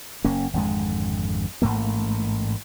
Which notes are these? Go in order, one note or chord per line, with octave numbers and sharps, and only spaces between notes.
F#1 A#3 C#4
G#1 F2 D3 G#3
A1 G#2 A3 A#3